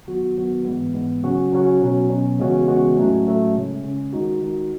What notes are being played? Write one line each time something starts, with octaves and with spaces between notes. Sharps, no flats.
F#2 D#3 F#3 B3 F#4
F#2 D#3 F#3 B3 F#4
G#2 E3 G#3 B3
G#2 E3 G#3 B3
C#3 F#3 C#4 F#4
C#3 F#3 C#4 F#4
B2 F#3 C#4
B2 F#3 C#4
E2 C#3 G#3 C#4 F#4
E2 C#3 G#3 C#4 F#4
A2 F#3 A3 C#4
A2 F#3 A3 C#4
C#3 G#3 C#4
C#3 G#3 C#4
D#3 G#3 D#4 F#4
D#3 G#3 D#4 F#4